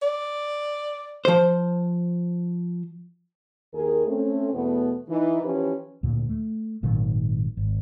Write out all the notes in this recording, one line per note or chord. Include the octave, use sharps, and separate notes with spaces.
D5
F3 C5
D#2 D#3 G#4 A#4
A3 C4 C#4
E2 B2 A3 B3
E3 D#4
E3 F3 C#4 G4 B4
D2 A#2
A3
G#1 A#2 D#3 F#3
G#1